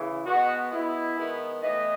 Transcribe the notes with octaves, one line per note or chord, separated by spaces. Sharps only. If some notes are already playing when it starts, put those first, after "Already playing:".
Already playing: C#3 E3
B2 G#3 B3 F#4
B2 G#3 B3 E4
D#3 G#3 B3
A2 E3 B3 D#5